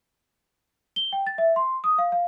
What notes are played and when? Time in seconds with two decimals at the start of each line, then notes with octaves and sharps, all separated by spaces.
0.96 G7
1.13 G5
1.27 A6
1.38 E5
1.56 C6
1.84 D#6
1.98 F5
2.12 F5